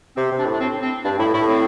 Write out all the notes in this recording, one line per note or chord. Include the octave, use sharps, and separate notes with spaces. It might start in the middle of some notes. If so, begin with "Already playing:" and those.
C3 C4
C3
D4
A2
D4
C4
C4
G2 D4
A2 E4
A2 E4
C4